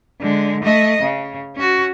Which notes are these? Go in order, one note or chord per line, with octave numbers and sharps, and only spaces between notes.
D3 G#3
A3 D#5
C#3
C#4 F#4